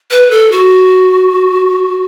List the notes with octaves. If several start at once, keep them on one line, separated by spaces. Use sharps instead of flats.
B4
A4
F#4